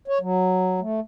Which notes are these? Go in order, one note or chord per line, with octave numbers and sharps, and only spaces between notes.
C#5
F#3
A3